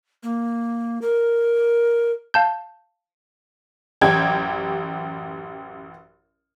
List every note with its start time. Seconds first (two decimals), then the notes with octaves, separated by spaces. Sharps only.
0.23 A#3
1.02 A#4
2.34 F5 A5 G6
4.01 A1 F#2 G4 G5 G#6